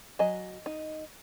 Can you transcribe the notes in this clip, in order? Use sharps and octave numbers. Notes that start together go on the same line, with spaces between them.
F#3 D#5 G#5
D#4